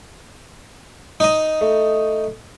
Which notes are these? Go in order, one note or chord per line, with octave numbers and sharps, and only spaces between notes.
D#4 D#5
A3